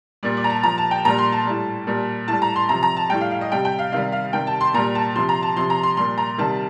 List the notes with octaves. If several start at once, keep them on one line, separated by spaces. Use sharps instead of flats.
A#2 G3 D5
D5
A#5
A5
A#2 F3 A#5
A5
G5
A#2 G3 A#5
C6
A5
A2 G3
A#2 G3
A2 G3 A5
A#5
C6
C3 F3 A#5
A#5
A5
A2 G3 G5
F5
F5
D#5
C3 G3 G5
G5
F5
C3 D#3 G3 F5
F5
C3 D#3 G3 G5
A5
C6
A#2 G3 A#5
A5
C3 F3 C6
A#5
A5
C3 F3 C6
A#5
C6
A#2 G3 C6
A#5
C3 D#3 G3 A5